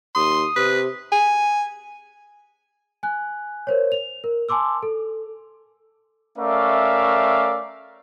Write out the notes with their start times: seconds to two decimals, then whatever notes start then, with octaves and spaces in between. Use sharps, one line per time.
0.15 D#2 C6 D#6
0.56 C3 B4
1.12 G#5
3.03 G#5 F#6
3.67 A#4 C5 C#5
3.92 F7
4.24 A#4
4.49 G#5 A5 C6 D6 E6
4.83 A4
6.38 A3 C#4 A#4 D5 E5 F5